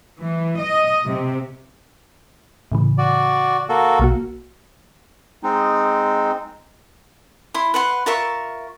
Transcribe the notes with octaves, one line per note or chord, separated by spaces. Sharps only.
E3
D#5
C3
A2 C#3 E3
F#4 D5
A#3 F#4 A4
B1 A#3 F#4
G#3 C4 D#4
E4 C6
B4 F#5 C6
F4 A#4 E5 C#6